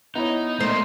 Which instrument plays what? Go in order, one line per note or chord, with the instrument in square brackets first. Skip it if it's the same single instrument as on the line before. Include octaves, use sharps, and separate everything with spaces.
[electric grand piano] B3 E4 C#5 [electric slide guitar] D#4
[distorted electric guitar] A3 A#3 [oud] C5